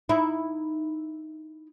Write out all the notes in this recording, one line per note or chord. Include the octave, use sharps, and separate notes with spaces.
D#4 E4